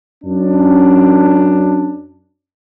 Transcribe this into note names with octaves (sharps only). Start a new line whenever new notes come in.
F#2 C#4 D4